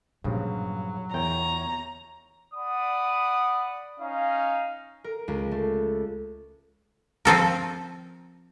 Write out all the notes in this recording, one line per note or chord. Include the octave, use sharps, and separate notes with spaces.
G2 A#2 C#3 F3 F#3 F4
E2 A#4 C#5 G5 A#5
D5 F#5 B5 D#6
C#4 D#4 F5
A#4
C#2
A3
F3 C4 A4 A#4